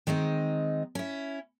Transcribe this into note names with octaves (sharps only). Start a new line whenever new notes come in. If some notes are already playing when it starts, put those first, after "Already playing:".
D#3 G#3 C4 D#4
C#4 E4